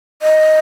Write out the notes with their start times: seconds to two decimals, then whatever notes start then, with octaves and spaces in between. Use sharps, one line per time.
0.22 D#5